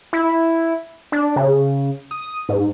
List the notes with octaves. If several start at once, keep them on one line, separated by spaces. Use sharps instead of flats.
E4
D4
C#3
D#6
G#2